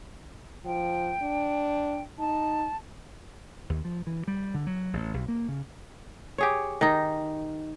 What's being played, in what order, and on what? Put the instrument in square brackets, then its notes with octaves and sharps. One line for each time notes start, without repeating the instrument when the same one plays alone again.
[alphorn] F3 [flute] G5
[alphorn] D4
[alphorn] D#4 [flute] A5
[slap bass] D#2
F3
E3
G3
D3
F#3
A1
B1
A#3
C#3
[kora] G4 G#4 C#5
D#3 D#4